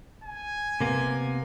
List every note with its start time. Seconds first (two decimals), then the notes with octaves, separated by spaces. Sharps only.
0.24 G#5
0.81 C3 A#3 B3